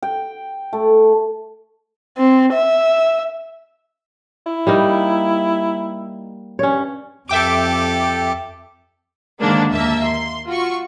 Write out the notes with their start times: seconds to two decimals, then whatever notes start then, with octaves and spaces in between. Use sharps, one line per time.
0.03 G5
0.73 A3
2.18 C4
2.53 E5
4.46 E4
4.67 G3 A#3 D#4
6.59 G2 C#4 C#5
7.29 F2 G4 A4 E5 G5 D6
9.40 G#2 D3 D#3 G#3 A#3 D4
9.73 D#2 A#3 E5 A5
10.05 C6
10.48 F4 F#4 C#6